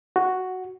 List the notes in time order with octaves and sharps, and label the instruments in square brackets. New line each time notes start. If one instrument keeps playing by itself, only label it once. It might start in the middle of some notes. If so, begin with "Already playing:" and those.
[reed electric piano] F#4